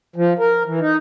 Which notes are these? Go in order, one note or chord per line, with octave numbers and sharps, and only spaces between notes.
F3
A#4
E3
D#4